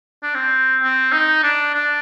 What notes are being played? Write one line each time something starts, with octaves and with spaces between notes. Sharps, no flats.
D4
C4
C4
D#4
D4
D4